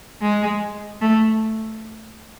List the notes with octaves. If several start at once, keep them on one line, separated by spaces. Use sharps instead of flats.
G#3
A3